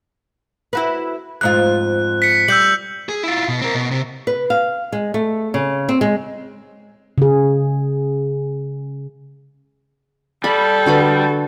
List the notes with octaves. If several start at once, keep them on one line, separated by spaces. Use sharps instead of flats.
E4 F#4 B4
F2 G#2 F4 F#6
B6 C#7
G3 E6 G6 F#7
G#4
E4 F4
B2
C4 A#4
B2
C3
B4
F5
G#3
A3
C#3
C4
G#3
C#3 G#4
G3 A4 B5
D3 F#4 B4